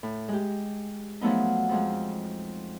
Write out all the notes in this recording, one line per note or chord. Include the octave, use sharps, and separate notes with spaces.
A2
G#3 G4
F3 F#3 A3 B3 D#4
F2 F3 G#3